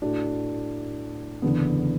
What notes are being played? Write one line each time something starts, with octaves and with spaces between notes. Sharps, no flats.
A2 A3 D4 F#4
F#1 E2 D3 B3